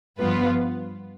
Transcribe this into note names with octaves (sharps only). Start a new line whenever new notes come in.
G2 F3 B3 F4 B4